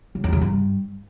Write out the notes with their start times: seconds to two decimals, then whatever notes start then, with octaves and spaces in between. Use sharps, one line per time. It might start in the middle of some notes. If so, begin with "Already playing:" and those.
0.15 C#3
0.24 E2
0.33 C#3
0.41 G2